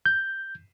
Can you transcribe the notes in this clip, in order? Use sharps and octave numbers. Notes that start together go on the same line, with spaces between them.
G6